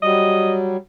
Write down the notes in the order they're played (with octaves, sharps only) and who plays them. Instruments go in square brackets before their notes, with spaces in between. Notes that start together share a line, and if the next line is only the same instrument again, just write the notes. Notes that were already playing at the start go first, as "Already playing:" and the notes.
[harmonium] F#3 G3 [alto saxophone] D#5